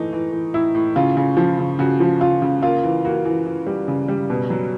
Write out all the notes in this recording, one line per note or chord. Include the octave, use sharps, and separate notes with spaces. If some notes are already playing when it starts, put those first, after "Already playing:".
Already playing: A2 E3 A3 D#4
E3
E3
A2 E4
A2
C#3 F4
C#3
F3
C#3
C#3 F#4
F3
C#3 F4
C#3
A#3 F4
E3
A#3 F#4
E3
E3
G3
C#3
G3
B2
F#3